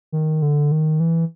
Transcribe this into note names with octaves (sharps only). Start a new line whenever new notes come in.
D#3
D3
D#3
E3